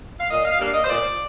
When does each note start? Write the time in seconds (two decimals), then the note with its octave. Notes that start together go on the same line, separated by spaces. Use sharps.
0.19 F5
0.30 A#2 D#5
0.45 F5
0.59 G3 A#3 D4 F5
0.74 D#5
0.84 C5
0.88 A#2 D5